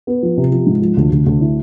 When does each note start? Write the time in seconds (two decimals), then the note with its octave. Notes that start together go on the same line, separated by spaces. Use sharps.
0.07 B3
0.23 F3
0.37 C3
0.52 F3
0.66 G#2
0.82 F3
0.97 D2
1.12 D2
1.26 D2
1.41 E4